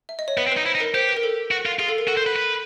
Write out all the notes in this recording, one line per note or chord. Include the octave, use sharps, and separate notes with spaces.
E5
D#5
C#5
B3 B4
C4
B4
D#4
E4 C5
D#4
A#4
G4 C5
B4
A#4
A4
F#4
F4
F4 G#4
A4
A#4
F#4 A4
C5
A4 B4
B4